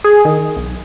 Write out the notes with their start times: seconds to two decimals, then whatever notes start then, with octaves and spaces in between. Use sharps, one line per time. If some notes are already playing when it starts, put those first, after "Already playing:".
0.04 G#4
0.25 D#3
0.57 B1